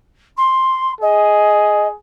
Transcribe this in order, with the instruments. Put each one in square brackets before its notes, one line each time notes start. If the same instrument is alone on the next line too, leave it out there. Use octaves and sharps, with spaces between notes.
[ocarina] C6
[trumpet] G#4 [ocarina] D#5